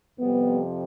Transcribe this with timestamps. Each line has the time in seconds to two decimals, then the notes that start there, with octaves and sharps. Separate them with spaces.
0.19 F2 C3 F3 G3 B3